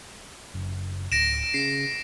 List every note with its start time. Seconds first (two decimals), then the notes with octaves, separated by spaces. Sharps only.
0.54 F#1
1.12 D1 A#6 D7 E7
1.54 C#3 C7